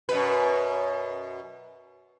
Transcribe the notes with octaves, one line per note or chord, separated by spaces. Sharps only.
F#2 B2 B4